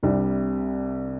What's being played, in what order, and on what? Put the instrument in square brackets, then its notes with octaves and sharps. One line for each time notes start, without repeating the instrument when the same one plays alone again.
[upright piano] C2 C3 G3 D4